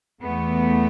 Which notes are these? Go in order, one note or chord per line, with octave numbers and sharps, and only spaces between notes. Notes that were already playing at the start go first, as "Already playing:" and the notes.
E2 E3 A3 B3